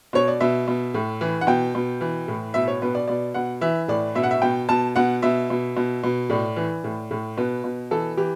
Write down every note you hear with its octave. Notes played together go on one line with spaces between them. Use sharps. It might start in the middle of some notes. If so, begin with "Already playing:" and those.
B2 C#5
D5
B2 E5
B2
A2
E3
F#5
B2 G5
B2
E3
A2
B2 E5
C#5
B2 B4
D5
B2 D5
B2 F#5
E3 E5
A2 D5
B2 E5
F#5
E5
B2 G5
B2 A5
B2 F#5
B2 E5
B2
B2
B2
A2 D5
E3
A2
A2
B2 B4
B2
E3 A4
E3 G4